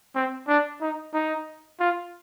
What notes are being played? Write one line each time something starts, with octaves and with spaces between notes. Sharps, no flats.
C4
D4
D#4
D#4
F4